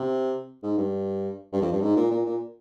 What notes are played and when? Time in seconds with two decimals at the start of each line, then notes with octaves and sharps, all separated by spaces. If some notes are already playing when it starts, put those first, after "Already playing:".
Already playing: C3
0.63 G#2
0.78 G2
1.53 G2
1.62 F2
1.72 G2
1.81 G#2
1.97 A#2
2.11 A#2
2.26 A#2